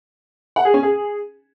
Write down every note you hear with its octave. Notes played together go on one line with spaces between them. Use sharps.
F#5
G#4
C#4
G#4